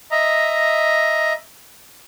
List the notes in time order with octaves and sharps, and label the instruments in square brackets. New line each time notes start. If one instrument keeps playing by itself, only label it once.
[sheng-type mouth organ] D#5 E5 A#5